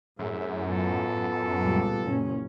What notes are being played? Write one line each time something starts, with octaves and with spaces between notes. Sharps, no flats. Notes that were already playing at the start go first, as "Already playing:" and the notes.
C2 F#2 A2 G#4 E5
B3 F4 A4
C#2 A#2 G3
F#1 A#2 C#4